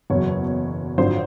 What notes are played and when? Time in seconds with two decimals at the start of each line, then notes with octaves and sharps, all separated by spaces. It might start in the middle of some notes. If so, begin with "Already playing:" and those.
0.10 F#1 E2 B2 F#3 C#5
0.98 G#1 F#2 D3 F3 C5